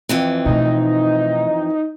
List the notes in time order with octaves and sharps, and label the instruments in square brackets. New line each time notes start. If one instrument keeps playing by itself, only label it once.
[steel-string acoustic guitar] F2 E3 C4
[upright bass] B2 A3 [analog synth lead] D#4